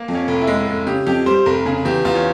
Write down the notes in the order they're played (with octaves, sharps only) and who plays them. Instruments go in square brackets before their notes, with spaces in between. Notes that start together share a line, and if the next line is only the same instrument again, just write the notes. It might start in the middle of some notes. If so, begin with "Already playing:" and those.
Already playing: [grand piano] A#3
[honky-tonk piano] F2
[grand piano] C#4
[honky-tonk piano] F1
[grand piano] E4
[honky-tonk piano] G#3
F1
[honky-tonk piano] C#3 [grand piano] G4
[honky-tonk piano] F2 [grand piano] G4
[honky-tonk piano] G3 [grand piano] C5
[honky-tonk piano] F1 [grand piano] A#4
[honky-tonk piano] C#3 [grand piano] G#4
[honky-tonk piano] E2 [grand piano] G4
[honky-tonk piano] E2 [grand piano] F4
[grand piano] C#4